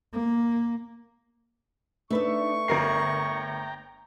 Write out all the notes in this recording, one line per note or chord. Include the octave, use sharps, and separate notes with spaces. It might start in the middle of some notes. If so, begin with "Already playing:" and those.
A#3
A3 D4 D#4 B4 E5 C#6
G1 A#4 G5 A#5 C7